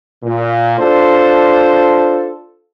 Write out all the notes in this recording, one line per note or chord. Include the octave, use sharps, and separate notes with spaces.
A#2
D4 F4 A4 C5